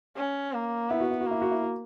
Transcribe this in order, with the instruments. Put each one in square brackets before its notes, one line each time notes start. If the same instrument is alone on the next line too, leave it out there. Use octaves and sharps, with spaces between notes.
[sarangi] C#4
A#3
[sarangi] B3 [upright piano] E4
[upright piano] F#4
E4
F#4
[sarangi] A#3 [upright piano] E4
[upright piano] F#4
E4
F#4